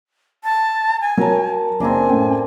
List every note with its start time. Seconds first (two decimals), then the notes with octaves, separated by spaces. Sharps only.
0.44 A5
1.01 G#5
1.18 F#3 A#4 C#5 A5
1.80 F#1 C4 D4 G#5 A#5
2.09 A2 C#4 G5